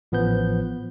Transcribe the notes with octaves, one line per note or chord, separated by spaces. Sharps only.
A1 F3 B3 B4 G6